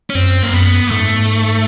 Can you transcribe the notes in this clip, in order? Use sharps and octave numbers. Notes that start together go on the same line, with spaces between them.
C#4
F#2 C4
A#3
F#2 B3
A#3
G#2 A3